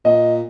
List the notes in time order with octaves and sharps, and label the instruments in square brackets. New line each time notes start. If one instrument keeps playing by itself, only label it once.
[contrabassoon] A#2 [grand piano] D#5